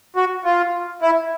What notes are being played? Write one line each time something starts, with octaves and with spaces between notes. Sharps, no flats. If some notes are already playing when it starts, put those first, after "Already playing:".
F#4
F4
E4